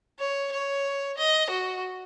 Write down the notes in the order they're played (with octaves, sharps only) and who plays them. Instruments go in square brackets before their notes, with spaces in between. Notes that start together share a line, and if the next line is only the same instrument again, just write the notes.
[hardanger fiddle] C#5
C#5
D#5
F#4